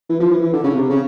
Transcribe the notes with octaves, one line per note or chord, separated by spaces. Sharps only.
E3
F3
E3
E3
D3
C#3
C3
C#3